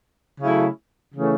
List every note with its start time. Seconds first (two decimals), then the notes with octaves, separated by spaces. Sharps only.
0.40 C#3 F#3 A3 E4
1.14 C#3 E3 A3 C#4